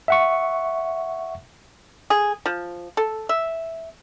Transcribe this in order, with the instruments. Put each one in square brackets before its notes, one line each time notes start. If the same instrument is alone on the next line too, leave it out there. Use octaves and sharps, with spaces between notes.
[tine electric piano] E5 F#5 C#6
[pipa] G#4
F3
A4
E5